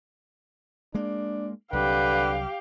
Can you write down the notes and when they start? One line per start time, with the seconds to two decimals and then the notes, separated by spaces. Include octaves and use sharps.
0.95 G#3 A#3 D4
1.73 C2 D3 F#3 G4 B4 F5